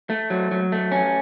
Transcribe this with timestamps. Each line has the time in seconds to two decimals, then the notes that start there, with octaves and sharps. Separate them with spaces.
0.10 A3
0.30 F#3
0.51 F#3
0.72 A3
0.92 C#4